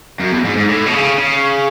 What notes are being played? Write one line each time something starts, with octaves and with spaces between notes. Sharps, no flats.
F#2
E2
G#2
G#2
A2
B2
C#3
C#3